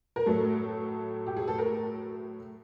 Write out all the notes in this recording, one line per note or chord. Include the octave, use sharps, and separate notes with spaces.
A#4
A2 F#3 A3 A4
G4
G#4
A4
A#4